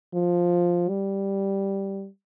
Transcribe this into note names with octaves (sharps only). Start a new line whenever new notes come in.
F3
G3